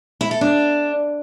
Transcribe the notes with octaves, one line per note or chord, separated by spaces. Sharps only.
E4
A4
D4